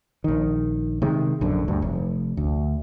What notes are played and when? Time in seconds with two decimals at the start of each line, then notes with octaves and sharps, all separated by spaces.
0.24 A#1 D#3
1.02 C3 D#3 G#3
1.41 A#1 F#2 D3
1.68 D2 G2
1.82 F1
2.37 D2